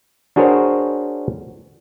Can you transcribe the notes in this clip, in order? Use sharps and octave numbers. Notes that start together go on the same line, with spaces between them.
D4 F#4 G#4 A#4 C5 C#5